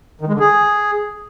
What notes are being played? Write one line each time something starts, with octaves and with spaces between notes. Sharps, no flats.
D#3
G#3
D3
G#4